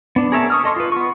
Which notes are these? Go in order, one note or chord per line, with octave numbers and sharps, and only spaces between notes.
B3 D4
G#4 A#4 C#5 E5 A5
C#6 D#6 F6
A4 D#5 C6 C#6
F4 B4
B3 C#6